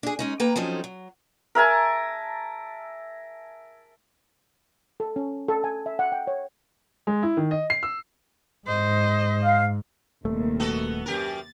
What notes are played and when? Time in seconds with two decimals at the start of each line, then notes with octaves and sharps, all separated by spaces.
0.03 D4 G#4
0.19 G#3 C#4 D#4
0.40 A#3 B4 G5 A#5
0.56 F3 F#3 C4 C#4 D#4 A4
0.84 F#3
1.55 A#4 E5 G#5 A5
5.00 A4
5.16 C#4
5.48 A4
5.64 G#5
5.86 E5
5.99 F#5
6.12 G5
6.27 C#5
7.07 G#3
7.23 E4
7.37 D#3
7.51 D#5
7.70 C7
7.83 E6
8.67 G#2 C5 D#5
9.43 F5
10.25 D#1 D#2 C3 A3
10.60 B3 F#4 A4
11.06 F#2 G4 A#4 A6